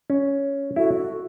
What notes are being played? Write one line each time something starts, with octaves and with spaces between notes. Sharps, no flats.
C#4
E4 F#4 A4